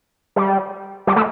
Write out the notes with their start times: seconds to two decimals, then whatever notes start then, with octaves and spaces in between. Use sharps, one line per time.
0.36 G3
1.07 G3
1.16 A3